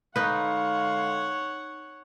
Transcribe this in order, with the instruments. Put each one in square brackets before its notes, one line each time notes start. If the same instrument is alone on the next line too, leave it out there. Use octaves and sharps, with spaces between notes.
[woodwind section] D3 G#3 F5 [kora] D#4 B4 [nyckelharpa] C#5 F#5